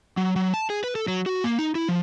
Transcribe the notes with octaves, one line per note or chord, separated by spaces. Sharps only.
F#3
F#3
A5
G#4
B4
A4
F#3
F#4
A#3
D#4
E4
F3